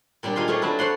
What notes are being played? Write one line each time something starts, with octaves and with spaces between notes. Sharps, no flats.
A#2 G3 D4 G4
D#4 F4 G#4 C6
A3 G4 G#4 C5 C#5
F#3 D4 E4 A4 B4
C5 C#5 F#5 C6